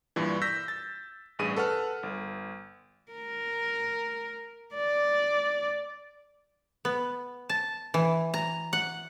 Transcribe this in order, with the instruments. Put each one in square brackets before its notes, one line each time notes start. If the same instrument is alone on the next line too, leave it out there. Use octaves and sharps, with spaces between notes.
[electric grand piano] G2 A#2 E3
E6 G6 A#6 B6
A6
A1 G2 G#4 D#7
A4 B4 F#5 A5 F6
G1
[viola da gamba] A#4
D5
[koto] B3
A5
E3
A#5
F#5